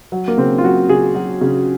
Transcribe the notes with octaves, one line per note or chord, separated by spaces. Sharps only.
F#3
A#3
C#3 C4
F4
F#3 F#4
C#3 G#4
F#3
C#3